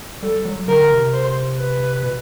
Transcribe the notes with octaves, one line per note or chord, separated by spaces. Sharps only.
G3 A4
F#3
D3 A#4
C3
C5
B4
B2